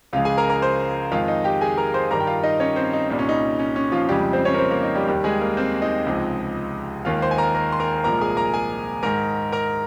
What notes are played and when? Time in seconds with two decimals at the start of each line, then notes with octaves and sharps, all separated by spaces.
0.13 C#2 C#3 F3 G#3 F4 F5
0.25 G#4 G#5
0.38 A#4 A#5
0.50 A#4 A#5
0.62 C5 C6
1.12 F2 D#3 G#3 F4 F5
1.28 D#4 D#5
1.44 G4 G5
1.61 G#4 G#5
1.77 A#4 A#5
1.94 C5 C6
2.11 G2 D#3 G3 A#4 A#5
2.20 G5
2.27 F4 F5
2.43 D#4 D#5
2.60 C#4 C#5
2.76 C4 C5
2.93 D#4
3.10 C2 A#2 G3 D#4
3.19 C#4
3.29 D#4
3.59 C#4
3.76 C#4
3.92 F3 F4
4.09 F2 C#3 F3 G3 G#3 G4
4.33 C4 C5
4.45 C#4 C#5
4.54 A#4
4.58 C4 C5
4.70 A#3 A#4
4.83 D#4
4.95 G3 G4
5.07 D#2 D#3 G3 G4
5.24 G#3 G#4
5.41 A#3 A#4
5.57 C4 C5
5.82 D#4 D#5
6.06 C#2 C3 F3 G#3
7.05 D#2 D#3 G#3 F4 F5
7.22 C5 C6
7.31 G#5
7.38 A#4 A#5
7.55 A#4 A#5
7.72 C6
7.80 A#4 A#5
8.04 C2 A#2 F3 G#3 A#4 A#5
8.21 G#4 G#5
8.37 A#4 A#5
8.54 G#4 G#5
9.03 G#2 D#3 G#3 A#4 A#5
9.52 A#4 A#5